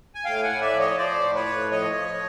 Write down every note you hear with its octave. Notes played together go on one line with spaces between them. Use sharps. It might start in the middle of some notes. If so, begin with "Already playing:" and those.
G#5
A2 F5 G5
F#5 G#5
A2
D5 E5
F3
C#5 D#5
F3 C5 D5
A2
B4 C#5
A2
F3 C#5 D#5
F3